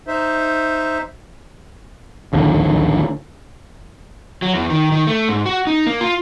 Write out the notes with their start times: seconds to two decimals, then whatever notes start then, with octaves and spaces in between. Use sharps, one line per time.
0.07 D#4 C5 E5
2.33 D1 A#1 D#2 D3
4.42 F#3
4.54 E2
4.70 D#3
4.92 D#3
5.07 A3
5.29 G#2
5.46 F#4
5.67 D#4
5.87 A#3
6.01 F4